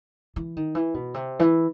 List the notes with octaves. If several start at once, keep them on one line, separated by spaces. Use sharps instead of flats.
E3
D#3
E3
B2
C3
E3